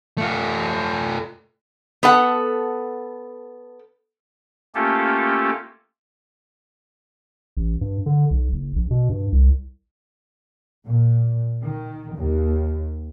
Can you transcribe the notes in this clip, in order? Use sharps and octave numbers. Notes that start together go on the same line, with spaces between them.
A3 F4
B3 A4 F#5
A3 A#3 C#4 F4 G4 A4
A1
G2
D3
B1
F#1
A#1
B2
G2
C2
A#2
D#3
D#2